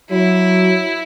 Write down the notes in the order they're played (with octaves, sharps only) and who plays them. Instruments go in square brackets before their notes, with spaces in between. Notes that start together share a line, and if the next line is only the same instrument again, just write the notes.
[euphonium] F#3 [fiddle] E4